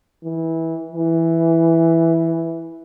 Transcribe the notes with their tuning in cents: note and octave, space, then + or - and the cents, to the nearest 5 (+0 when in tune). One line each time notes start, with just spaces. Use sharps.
E3 -20
E3 +0